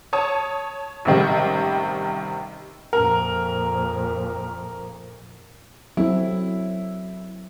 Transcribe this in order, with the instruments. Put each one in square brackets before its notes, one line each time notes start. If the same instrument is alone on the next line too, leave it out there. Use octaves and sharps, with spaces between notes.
[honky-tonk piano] C#5 A5 D#6
A1 C3 D#3 G3
[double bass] F2 A#2 [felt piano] A#4
[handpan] F#3 C4 A4 [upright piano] E4